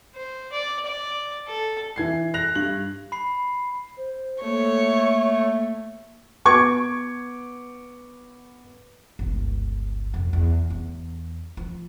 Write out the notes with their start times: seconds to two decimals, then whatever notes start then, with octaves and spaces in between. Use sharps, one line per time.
0.15 C5
0.52 D5
0.86 D5
1.48 A4
1.96 E3 G#6 C7
2.34 F#6 A#6 F7
2.55 G2 F#7
3.12 B5 C7
3.97 C5
4.43 A3 A#3 C#5
6.45 B3 C#6 D6 G#6
9.19 G1 C#2
10.14 F2 C3
10.33 E2
10.70 E2
11.57 F3